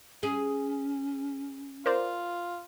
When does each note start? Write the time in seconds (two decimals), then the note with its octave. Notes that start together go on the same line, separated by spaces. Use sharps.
0.23 C#4 G#4
1.86 F4 A#4 C5 D5